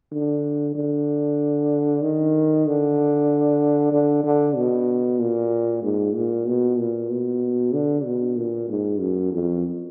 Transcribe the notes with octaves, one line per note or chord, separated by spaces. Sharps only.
D3
D3
D#3
D3
D3
D3
B2
A#2
G#2
A#2
B2
A#2
B2
D3
B2
A#2
G#2
F#2
F2